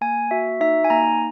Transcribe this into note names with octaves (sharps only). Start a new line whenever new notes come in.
A#3 G#5
F#4 E5
D#4 E5
G#5
A#3 A#5